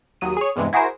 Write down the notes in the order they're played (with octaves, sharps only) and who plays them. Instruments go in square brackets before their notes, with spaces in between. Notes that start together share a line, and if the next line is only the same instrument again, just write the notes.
[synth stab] D#2 F#3 D#6 D#7
G#4 C#5
E2 G2 C3 E3 G#3
E4 F#4 G#4 A#4 C5